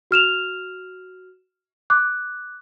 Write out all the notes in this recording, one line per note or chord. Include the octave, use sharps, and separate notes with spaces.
F#4 F6 E7 F7
D6 F#6